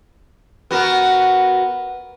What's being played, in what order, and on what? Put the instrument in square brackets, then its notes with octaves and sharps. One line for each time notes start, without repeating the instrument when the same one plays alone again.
[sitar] B3 F#4 A#4